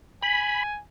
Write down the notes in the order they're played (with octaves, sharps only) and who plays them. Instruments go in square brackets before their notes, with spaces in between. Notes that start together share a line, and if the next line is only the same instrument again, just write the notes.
[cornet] G#5 [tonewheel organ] B5